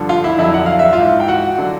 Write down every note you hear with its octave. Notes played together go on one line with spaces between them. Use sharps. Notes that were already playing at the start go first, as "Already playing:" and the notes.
Already playing: G2 D3 F3
F4 F5
E4 E5
F2 D3 F#3 E4 E5
F#5
F5
E5
F4 F5
G#2 E3
G5
F#4 F#5
D3 F#3